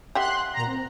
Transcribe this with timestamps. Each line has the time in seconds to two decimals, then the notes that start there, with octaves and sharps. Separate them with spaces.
0.15 G4 E5 F#5 C6 F#6
0.54 A#2 A#5
0.67 C4